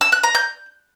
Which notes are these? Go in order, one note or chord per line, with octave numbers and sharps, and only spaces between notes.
E6
F#6
A#5
G6